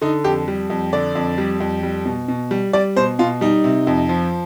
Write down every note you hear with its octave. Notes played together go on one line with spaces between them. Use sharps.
D3 D#4
F2 G4
G3
F2
D3 D5
F2
G3
F2
G3
B2
B2
G3
G3 D5
B2 C5
B2 F4
G3 D#4
C3
F2
F3